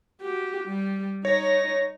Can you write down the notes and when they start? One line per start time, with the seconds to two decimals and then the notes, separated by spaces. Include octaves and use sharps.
0.21 F#4 G4
0.64 G3
1.25 D#4 C#5 A#6